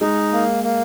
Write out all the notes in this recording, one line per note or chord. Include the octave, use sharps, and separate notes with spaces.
G#3 D#4
A#3
A#3